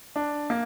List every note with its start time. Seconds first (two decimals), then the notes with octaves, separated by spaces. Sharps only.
0.16 D4
0.50 A#3